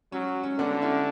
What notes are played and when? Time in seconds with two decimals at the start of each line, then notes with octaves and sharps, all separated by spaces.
0.12 F#3 C#4
0.44 C#4
0.58 D3 B3 D4
0.82 C#4 E4